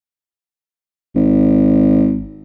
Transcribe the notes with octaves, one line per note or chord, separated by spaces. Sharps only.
G#1